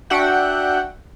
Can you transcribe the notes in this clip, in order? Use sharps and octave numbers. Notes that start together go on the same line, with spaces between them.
D4 F#4 E5 F#5 G5